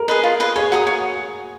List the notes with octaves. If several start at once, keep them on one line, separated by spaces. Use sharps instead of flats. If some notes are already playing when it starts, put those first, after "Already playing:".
Already playing: A#4
G#4 B4 D#5
F4
G#4 B4 D#5
G#4 C#5
F#4 F#5 A#5 D#6
C#5